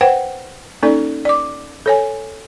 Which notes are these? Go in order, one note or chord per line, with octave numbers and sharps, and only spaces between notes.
B4 C5 F#5 G5
A#3 C#4 D#4 A4 D5
D5 D6
A4 C#5 G#5